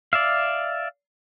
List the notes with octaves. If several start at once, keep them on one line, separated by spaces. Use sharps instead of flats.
D5 E5 F5